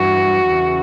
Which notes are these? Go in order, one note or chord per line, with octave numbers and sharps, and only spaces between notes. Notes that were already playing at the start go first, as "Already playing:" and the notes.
Already playing: G2 E3 F#4
E2 C#3 E3